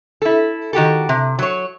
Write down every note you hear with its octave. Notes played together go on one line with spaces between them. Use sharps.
E4 A4
D#3 F#4 G4 A4
C3
F#3 C#5